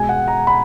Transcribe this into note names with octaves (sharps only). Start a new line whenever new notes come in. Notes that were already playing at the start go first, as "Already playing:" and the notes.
Already playing: B2 G#3 G#5
F#5
A#5
B5